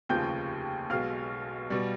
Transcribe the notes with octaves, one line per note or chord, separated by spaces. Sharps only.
F1 D#2 C#3 F3 G5 G6
B1 B2 G#3 F5 F6
B2 G3